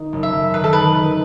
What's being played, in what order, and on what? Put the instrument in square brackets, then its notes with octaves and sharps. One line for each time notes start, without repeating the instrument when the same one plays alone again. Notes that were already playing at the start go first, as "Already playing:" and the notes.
Already playing: [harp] D#3
F#1
[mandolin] E5
[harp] F#1
[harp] D#3 [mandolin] B4
[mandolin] A4
[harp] D#3 [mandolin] B4
[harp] D#3